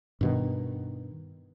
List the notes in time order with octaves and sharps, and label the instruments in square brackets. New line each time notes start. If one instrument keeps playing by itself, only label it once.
[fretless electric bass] G2 B2 D#3